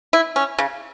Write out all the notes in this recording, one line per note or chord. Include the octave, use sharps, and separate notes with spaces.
E4
C#4
C#3